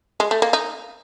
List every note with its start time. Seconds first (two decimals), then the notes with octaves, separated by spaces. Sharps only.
0.20 G#3
0.31 A3
0.42 A#3
0.53 D#4